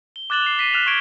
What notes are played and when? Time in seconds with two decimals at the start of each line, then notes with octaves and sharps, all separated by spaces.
0.16 G7
0.30 D6 F#6 A6 E7 F#7 G7
0.42 C7 F7
0.59 B6 C7 D#7
0.73 F6 F#6 A6 E7 F7
0.86 C#6 D6 F6 G#6 D7 G7